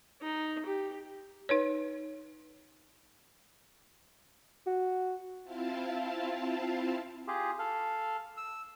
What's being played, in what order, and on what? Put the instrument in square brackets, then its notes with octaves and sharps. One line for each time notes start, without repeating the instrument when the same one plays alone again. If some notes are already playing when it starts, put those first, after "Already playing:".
[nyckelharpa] D#4
G4
[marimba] D#4 B4 C#5
[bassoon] F#4
[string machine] C4 E4 F4 F5 A5
[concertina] F4 G4 G#4
A4 F5
E6